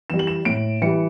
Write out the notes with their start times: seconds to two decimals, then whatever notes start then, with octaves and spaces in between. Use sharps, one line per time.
0.10 E3 G3 E7
0.19 F#7
0.27 E7
0.45 A2 D7
0.82 E3 G3 C#7